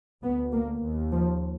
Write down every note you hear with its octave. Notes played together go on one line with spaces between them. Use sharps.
D2 B3
A#3
D#2
F3